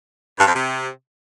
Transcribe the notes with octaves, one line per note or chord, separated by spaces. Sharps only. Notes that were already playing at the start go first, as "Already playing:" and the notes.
G2
F2
C3